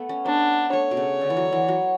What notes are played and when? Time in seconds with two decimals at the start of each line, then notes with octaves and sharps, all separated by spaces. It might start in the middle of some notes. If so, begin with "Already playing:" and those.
Already playing: A3 B3
0.09 C#4
0.26 B3 D4
0.73 A3 C#5
0.91 B2
0.97 C#3
1.21 D3
1.30 E3
1.37 F#3
1.53 E3
1.68 F#3